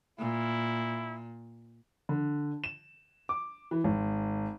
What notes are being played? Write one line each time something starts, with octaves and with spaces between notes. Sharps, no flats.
A#2 E4
D3
E7
D6
E3
G#1